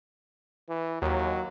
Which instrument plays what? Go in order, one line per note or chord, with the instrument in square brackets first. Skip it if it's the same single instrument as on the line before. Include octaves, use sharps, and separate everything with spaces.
[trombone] E3
[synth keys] D#2 [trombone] F#3